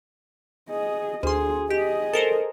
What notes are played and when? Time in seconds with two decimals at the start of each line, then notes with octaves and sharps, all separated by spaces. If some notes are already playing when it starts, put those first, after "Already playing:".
0.70 G#4 D#5
1.23 D2 G#4 C6
1.70 G4 G#4 D#5
2.14 A4 A#4 C5